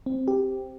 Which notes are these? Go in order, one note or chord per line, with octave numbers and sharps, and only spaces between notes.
C4
G4